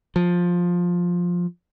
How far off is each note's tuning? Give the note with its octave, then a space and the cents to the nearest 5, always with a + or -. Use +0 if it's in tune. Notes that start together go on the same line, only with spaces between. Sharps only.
F3 +10